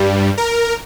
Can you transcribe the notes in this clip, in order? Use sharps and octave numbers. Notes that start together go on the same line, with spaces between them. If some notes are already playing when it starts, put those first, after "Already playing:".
Already playing: G2 G3
A#4